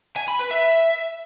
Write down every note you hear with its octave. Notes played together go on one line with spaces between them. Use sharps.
G#5
B5
B4
E5